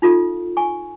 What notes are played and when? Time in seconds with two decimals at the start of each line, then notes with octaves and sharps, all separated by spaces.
0.02 D#4 F4 A4 F5
0.57 G#5 C#6